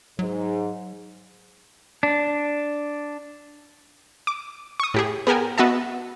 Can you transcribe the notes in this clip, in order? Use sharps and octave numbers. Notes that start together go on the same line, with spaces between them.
G#2 F#3
D4
D6
C#6 D#6
A2 G4 G#4
B3 G#4 A#4 G5 G#5
B3 F#4 D#5 E5 A5